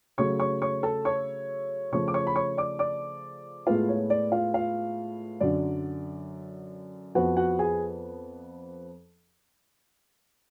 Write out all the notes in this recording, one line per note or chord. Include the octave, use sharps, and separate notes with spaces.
C#3 F#3 A3 C#5 C#6
C#5 C#6
C#5 C#6
A4 A5
C#5 C#6
C#3 F3 A3 C#5 C#6
D6
C#5 C#6
B5
C#5 C#6
D5 D6
D5 D6
A2 G#3 B3 F4 F5
C#5
D5
F4 F5
F4 F5
F#2 D3 F#3 D5
F2 F3 B3 F#4 F#5
F#4 F#5
G#4 G#5